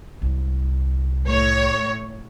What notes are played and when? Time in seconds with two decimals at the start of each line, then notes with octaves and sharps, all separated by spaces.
0.22 C2
1.24 A2 C#5